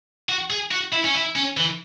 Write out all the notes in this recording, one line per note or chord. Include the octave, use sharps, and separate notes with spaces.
F#4
G#4
F#4
E4
C#4
E4
C#4
E3